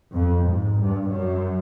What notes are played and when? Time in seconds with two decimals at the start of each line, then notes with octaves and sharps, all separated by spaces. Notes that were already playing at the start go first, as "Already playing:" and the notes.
0.15 F2
0.50 G#2
0.81 G2
1.12 F#2